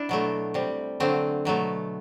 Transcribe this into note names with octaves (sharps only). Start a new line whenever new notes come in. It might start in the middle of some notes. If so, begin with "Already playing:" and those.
Already playing: D4 E4
B2 F#3 A3
C3 G3
D3 F#3 A3 C4
B2 F#3 A3